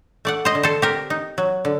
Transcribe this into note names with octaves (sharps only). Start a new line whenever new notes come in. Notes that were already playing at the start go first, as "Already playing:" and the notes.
A3 D5 F#5
C5 D#5
D3
A4 C5
C4 G4 A#4
D#4
F#3
D3